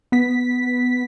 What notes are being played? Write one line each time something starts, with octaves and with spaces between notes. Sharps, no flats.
B3 B6